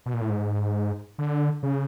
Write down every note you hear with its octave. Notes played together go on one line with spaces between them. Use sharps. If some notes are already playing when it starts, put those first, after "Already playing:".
B2
A#2
A2
G#2
D3
C#3